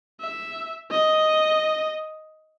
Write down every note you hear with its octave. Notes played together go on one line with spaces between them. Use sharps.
E5
D#5